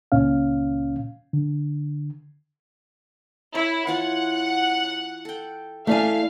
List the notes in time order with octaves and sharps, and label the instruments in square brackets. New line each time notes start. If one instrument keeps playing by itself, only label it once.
[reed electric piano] C#2 A#2 C#4 F5
D3
[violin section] E4 [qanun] C#5
[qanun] E3 F4 C#5 [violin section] F#5
[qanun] A4 G5
[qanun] E3 E4 [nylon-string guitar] A3 D5 G#5 [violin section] F5